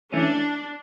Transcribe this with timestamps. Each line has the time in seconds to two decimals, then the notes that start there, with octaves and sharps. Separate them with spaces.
0.12 E3 A3 C#4 D4